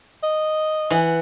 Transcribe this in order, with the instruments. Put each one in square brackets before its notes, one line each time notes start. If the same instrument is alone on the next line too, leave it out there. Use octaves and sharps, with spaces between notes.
[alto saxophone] D#5
[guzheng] E3 F#5